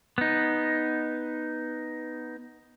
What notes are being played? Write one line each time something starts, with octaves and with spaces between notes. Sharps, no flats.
B3 D#4